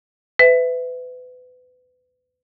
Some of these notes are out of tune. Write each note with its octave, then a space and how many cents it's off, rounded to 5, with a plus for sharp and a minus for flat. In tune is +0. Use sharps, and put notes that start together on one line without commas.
B4 +30 E5 +0